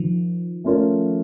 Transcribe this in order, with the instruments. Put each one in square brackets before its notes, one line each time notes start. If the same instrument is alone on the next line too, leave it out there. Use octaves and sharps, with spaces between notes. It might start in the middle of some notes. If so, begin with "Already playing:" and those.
Already playing: [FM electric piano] D#3 F3
[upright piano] A3 C#4 F4 A#4 C#5